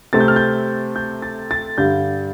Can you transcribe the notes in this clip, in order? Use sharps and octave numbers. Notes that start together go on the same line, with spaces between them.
C3 A3 C4 A6
G6
F6
G6
G6
A6
A6
G2 D3 G3 G6